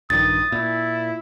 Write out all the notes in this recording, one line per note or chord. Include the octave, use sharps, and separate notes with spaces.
A#1 G2 D#3 D#6 A6
A#2 E4